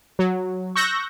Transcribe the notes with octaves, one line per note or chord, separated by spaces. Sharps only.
F#3
C#6 E6 F#6 G6 A#6